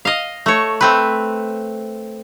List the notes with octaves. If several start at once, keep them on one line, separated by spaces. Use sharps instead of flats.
D#5 F5
A3 C#5
A3 C4 B4